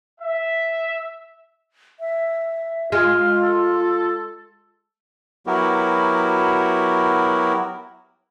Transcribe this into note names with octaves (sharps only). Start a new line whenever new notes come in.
E5
E5
G#3 F4 F5
A4
F#3 B3 E4 F#4 G4 A#4